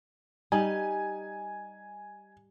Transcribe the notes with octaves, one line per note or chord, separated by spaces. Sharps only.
G3 D#4 G#5